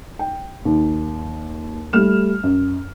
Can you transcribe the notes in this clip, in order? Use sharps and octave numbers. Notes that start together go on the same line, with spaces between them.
G5
D#2
G3 A3 F6 E7
F#2